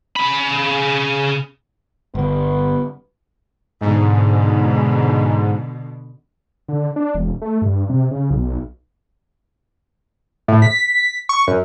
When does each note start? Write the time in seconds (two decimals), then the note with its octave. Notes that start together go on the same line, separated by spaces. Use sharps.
0.16 C#3 B5
2.15 G1 B3
3.81 G#2 B2 D3
6.68 D3
6.96 D4
7.14 E1
7.42 A3
7.62 G2
7.89 C3
8.11 C#3
8.30 B1
10.48 A2
10.62 B6
11.29 C#6
11.47 F#2